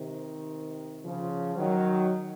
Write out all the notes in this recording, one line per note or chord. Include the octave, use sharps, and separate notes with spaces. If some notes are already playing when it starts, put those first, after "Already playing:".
Already playing: C3 D#3
C#3 F3
D#3 F#3